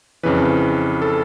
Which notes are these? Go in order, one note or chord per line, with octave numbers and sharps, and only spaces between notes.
F2 C#3 E3 B4
A4